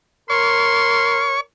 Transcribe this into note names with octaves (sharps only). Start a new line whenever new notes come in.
A#4 C#5 C6 C#6